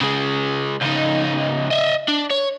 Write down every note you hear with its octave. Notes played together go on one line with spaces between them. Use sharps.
C#3 G#3
C#2 D#4
D#5 E5
D4
C#5